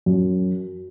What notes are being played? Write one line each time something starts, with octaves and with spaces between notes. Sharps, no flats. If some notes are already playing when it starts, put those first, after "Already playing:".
F#2 F#3